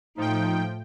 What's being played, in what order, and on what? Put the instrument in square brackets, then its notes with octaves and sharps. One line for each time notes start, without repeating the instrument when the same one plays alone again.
[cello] A2 [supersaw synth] F3 G5 [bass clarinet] D#4